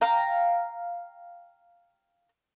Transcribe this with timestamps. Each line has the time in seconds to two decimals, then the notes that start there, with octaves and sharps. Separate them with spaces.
0.01 F5 G5 A#5